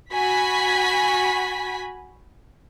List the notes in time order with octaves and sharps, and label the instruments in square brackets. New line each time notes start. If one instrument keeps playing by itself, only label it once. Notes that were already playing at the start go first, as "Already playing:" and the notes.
[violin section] F#4 G#5 B5 B6